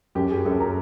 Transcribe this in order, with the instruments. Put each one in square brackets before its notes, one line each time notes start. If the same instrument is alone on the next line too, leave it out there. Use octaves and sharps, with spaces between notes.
[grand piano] F#2 [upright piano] G4
[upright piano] G#4
[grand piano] F#2 [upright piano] A4
[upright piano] A#4